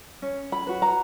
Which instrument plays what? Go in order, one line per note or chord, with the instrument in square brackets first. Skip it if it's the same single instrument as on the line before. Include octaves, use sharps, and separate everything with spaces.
[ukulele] C#4
B5
F#4 B4
A#5